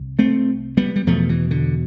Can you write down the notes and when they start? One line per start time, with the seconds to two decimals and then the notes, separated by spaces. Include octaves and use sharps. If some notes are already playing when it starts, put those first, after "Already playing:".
Already playing: C2
0.19 A3 C4
0.77 G3 B3
0.96 G3
1.07 E2 B2 F3 A3
1.29 E3
1.51 D3